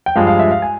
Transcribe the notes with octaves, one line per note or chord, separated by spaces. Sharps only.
G5
G2 F3 G#3 F5
F5
E5
F5
G#5